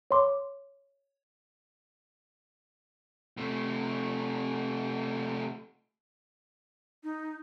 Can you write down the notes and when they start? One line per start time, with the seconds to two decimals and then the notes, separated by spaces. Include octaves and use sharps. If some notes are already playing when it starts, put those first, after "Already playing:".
0.11 C#5 C6 D6
3.37 C3 A3
7.04 D#4